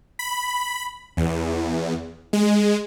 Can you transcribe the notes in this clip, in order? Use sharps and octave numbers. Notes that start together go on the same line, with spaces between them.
B5
E2
G#3